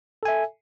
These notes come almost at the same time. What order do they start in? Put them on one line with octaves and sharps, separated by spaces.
A4 G#5 E5